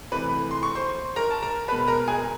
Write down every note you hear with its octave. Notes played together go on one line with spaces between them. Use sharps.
C3 E3 A3 B4 B5
C6
C#6
C5 C6
A#4 A#5
A5
A#4 A#5
B2 G#3 B4 B5
A#4 A#5
G#4 G#5